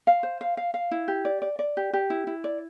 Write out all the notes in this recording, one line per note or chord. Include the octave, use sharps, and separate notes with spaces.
F5
C5
F5
F5
F5
E4
G4
D5
D5
D5
G4
G4
E4
E4
D5